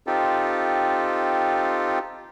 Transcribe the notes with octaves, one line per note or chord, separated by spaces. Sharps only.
C4 D#4 F4 G4 A4